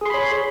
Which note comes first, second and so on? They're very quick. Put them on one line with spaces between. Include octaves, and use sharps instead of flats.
G#4 C6 B5 C#5